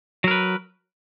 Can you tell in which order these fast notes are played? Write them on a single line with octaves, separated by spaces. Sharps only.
F#3 A#4 B4